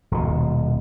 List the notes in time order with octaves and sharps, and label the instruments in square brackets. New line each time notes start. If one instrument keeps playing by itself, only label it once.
[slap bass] D#1 B2